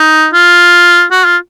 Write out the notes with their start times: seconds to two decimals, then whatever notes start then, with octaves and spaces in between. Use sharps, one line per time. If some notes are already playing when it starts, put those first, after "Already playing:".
Already playing: D#4
0.33 F4
1.11 F#4
1.25 F4